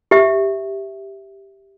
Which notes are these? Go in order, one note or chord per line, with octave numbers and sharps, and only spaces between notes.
G4 E5